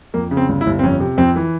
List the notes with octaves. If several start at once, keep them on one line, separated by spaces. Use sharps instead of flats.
F2 A#3
C#3
C4
G1
E4
G1
C4
F2 C#4
C3
F2 C4
E3